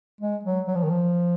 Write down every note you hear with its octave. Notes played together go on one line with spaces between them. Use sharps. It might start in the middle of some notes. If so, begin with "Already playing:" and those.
G#3
F#3
F#3
F3
D#3
F3